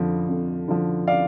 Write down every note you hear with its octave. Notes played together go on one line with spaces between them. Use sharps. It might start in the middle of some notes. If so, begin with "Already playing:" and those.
Already playing: F2 D3 F3
F2
D3 F3
D5 F5